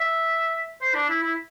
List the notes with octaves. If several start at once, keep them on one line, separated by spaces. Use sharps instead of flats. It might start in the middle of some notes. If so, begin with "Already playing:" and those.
Already playing: E5
C5
D4
E4
E4